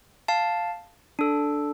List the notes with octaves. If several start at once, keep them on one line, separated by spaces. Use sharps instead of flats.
F5 A5
D4 A4